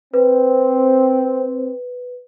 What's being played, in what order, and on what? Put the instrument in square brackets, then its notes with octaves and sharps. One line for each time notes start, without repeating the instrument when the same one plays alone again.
[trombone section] C4 [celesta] B4